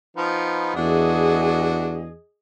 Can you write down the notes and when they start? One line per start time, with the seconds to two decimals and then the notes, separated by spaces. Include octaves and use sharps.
0.17 F3 B3 D#4
0.75 E2 A3 D4 F#4 G#4 D#5